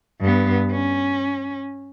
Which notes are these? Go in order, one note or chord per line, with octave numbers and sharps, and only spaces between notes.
G2 B3
C#4